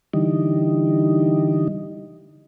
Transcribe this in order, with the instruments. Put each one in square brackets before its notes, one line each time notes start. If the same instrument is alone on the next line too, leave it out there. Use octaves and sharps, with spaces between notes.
[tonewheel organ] D3 E3 G3 D#4